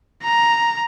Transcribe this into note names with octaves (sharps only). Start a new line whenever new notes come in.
A#5